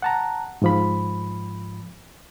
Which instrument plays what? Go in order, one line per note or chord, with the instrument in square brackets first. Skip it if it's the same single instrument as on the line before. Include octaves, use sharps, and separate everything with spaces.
[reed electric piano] F#5 A5 A#5
G#2 F3 B5